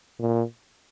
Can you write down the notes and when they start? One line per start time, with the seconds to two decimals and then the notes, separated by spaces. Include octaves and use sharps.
0.19 A#2